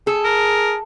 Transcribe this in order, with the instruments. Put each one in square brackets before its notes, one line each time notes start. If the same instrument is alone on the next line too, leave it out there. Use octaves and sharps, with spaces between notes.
[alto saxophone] G#4 [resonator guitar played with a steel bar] A4
[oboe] A#4